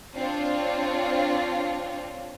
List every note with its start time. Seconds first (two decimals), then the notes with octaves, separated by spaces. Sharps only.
0.14 C4 D4 F4 C#5